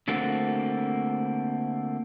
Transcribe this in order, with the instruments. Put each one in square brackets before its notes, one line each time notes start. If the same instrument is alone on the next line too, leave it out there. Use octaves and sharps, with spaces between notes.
[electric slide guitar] D3 A3 A#3 C4 F#4